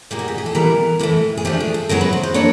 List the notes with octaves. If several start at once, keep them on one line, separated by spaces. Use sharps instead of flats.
A#2 G3 A#3 G#4
F#4
G4
G#4
A4
E3 G3 B3 E4 A#4
A2 E3 A3 A4
G#4
F3 A3 D4 G4
G#4
A4
C#3 F#3 B3 A#4
B4
C5
C5
F#3 A#3 D4 C#5